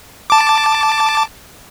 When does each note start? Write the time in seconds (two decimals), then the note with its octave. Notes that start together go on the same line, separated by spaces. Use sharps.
0.30 A5 D6